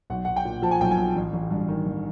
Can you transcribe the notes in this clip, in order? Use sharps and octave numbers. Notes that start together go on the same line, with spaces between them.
B1 F#5
B1 F#5
G5
A#2
F3 A5
G#5
B1 G5
G#5
B1
A1
A1
G2
D#3
A1